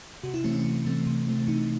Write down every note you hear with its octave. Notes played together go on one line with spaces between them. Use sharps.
C3 F#4
E4
E3 A3 C4 C#4
C#4
C3
E3 A3 C4
C3
E3 A3 C4
C3 D#4